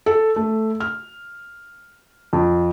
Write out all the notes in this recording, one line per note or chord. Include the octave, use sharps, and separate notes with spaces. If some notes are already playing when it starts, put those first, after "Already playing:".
A4
A3
F6
F2